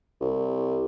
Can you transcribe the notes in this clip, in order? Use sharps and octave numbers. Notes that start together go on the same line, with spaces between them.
C2